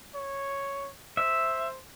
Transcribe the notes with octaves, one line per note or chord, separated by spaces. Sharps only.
C#5
C5 E5